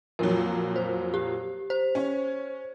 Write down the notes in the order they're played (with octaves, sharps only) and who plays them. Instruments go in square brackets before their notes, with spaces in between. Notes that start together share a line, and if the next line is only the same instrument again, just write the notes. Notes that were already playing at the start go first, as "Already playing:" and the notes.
[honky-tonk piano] F2 A#2 F#3 [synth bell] A#4
[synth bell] C5
G4
C5
[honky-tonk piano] C#4 C#5